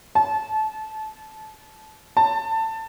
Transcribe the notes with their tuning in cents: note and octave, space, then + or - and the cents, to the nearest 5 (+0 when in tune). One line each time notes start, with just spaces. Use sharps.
A5 -25
A5 +20